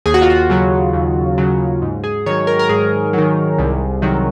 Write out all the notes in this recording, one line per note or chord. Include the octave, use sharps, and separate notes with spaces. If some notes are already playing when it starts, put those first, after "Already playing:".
D#2 G#4
F#4
F4
F#4
C#3 F#3
D#2
C#3 F#3
G#2
G#4
D#3 F#3 C#5
A#4
A#4
G#2 G#4
D#3 F#3
C2
C3 D#3 F#3